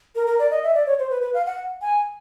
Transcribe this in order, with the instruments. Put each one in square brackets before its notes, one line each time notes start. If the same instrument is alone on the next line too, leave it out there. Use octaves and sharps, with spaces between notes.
[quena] A#4
A#4
D5
D#5
E5
D5
C#5
C5
B4
B4
F5
F#5
G#5